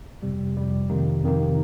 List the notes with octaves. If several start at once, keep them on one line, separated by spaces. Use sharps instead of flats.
F2 C3 G3
F2 C3 G3
F2 C3 D#3 A#3 D#4
F2 C3 D#3 A#3 D#4